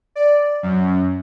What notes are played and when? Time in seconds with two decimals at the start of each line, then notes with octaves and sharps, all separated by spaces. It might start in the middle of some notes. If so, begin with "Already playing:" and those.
0.16 D5
0.63 F#2